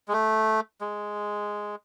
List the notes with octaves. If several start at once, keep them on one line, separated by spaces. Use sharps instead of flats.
G#3
A3
G#3